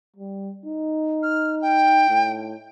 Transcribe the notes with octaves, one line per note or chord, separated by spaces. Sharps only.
G3
D#4
F6
G5
A2